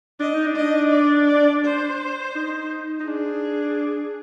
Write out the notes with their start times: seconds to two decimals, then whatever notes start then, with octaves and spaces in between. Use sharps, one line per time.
0.20 D4 D#5
0.34 D#4
0.47 D4
0.56 D#5
0.92 D5
1.27 D5
1.64 C5
2.35 D#4
3.00 D#4
3.07 D4 G#4